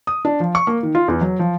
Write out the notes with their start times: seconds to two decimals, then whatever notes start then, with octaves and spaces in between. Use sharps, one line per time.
0.07 D#6
0.25 D4
0.40 F3
0.55 C#6
0.67 A#3
0.83 D#3
0.95 F4
1.08 E2
1.21 F#3
1.39 F3